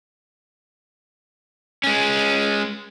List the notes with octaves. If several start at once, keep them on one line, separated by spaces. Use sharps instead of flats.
G#3 C#4